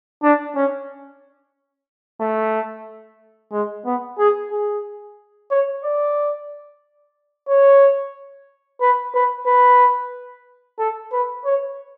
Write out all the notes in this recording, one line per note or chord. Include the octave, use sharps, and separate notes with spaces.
D4
C#4
A3
G#3
B3
G#4
G#4
C#5
D5
C#5
B4
B4
B4
A4
B4
C#5